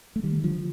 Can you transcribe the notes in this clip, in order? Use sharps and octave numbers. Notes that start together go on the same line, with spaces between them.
A3
D#3 G3
D3 F3